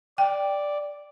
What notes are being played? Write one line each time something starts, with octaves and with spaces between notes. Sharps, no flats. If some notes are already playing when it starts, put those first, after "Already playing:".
D5 G5